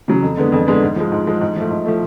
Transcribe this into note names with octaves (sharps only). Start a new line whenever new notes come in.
C#3 F#3
F2
D3 G#3 B3
F2
D3 G#3 B3
G#2
F3 G#3
G#2
F3 G#3
G#2
F3 A3
G#2
F3 A3